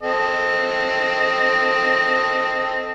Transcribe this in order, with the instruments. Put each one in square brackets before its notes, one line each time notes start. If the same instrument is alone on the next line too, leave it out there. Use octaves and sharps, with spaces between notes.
[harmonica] C4 A4 D#5